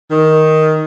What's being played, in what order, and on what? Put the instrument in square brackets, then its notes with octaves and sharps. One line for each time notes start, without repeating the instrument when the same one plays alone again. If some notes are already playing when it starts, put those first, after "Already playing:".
[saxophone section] D#3